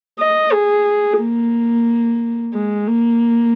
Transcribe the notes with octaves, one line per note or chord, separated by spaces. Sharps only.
D#5
G#4
A#3
G#3
A#3